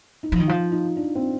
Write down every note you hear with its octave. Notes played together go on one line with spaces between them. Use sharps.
D#4
F3
D#3
F3 F4
D#4
D4
C4